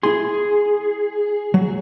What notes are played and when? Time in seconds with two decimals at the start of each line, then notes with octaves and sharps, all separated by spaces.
0.03 E4 G#4 C6
1.54 F#3